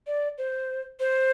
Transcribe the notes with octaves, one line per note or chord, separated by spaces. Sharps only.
D5
C5
C5